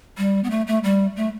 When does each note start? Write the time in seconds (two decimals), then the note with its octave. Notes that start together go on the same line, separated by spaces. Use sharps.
0.18 G3
0.44 B3
0.51 A3
0.67 A3
0.84 G3
1.16 A3